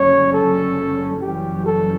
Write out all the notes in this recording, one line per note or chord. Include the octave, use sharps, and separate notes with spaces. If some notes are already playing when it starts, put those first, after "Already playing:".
Already playing: F#1 F#2 D3 G3 C#4 C#5
A4
F#1 F#2 E3 G3 C#4 G4
A4